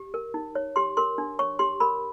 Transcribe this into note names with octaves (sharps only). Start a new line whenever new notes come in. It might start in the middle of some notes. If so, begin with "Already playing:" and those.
Already playing: G4
A#4
D#4
C#5
G4 C6
A#4 C6
D4
C#5 C#6
G4 C6
A#4 B5